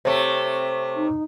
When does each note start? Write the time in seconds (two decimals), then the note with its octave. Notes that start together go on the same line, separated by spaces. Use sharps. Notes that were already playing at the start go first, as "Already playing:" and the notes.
0.05 C3 A3 C5 C#5 C#6
0.96 D#4